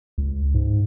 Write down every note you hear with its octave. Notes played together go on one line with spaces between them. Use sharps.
C#2
G#2